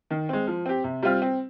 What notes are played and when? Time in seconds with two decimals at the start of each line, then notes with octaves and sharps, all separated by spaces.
0.10 D#3
0.29 G#3 C4
0.47 F3
0.66 C4 G4
0.84 C3
1.03 G3 C4 F4
1.22 C4